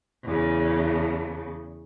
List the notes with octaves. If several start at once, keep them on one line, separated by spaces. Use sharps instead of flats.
E2 C#3